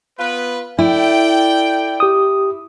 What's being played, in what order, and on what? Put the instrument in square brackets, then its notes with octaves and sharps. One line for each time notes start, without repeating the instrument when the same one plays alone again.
[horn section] B3 F4 B4
[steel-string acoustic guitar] E4 [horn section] A4 D5 G5
[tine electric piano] G4 D#6